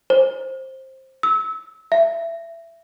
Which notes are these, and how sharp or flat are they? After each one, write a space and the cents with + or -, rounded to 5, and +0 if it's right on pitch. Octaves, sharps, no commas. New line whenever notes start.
C5 +15
E6 -25
E5 +20